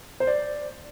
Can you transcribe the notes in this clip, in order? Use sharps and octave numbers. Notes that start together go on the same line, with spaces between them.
C5
D5